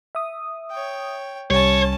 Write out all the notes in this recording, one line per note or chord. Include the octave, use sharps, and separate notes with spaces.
E5 D#6
C#5 G5
C2 G3 C#4 C#5 A5